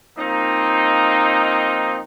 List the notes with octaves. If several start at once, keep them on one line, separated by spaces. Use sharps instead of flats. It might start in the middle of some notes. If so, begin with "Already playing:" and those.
F3 A#3 C4 D#4